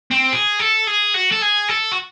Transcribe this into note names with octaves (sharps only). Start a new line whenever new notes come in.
C4
G#4
A4
G#4
F#4
A4
G#4
A4
F#4